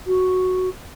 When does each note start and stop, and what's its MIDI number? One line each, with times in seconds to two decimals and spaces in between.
0.07 0.69 66